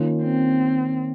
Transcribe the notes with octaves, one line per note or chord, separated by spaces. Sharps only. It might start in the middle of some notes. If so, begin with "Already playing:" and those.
Already playing: D#3 A#3 C#4 F4
C4